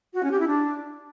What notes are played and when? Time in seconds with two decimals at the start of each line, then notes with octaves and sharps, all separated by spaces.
0.14 F#4
0.22 C#4
0.30 G4
0.39 E4
0.47 D4